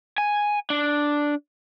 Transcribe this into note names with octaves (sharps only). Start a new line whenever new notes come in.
G#5
D4